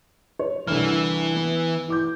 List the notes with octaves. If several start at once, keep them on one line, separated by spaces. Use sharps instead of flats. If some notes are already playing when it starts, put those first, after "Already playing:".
C#5
C2 D3 E3 B4 F6
B3
E3 D6 G6